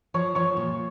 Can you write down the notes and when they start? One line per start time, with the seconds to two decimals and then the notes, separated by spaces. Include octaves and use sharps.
0.14 F3 C#5 C#6
0.35 F3 C#5 C#6
0.57 A#2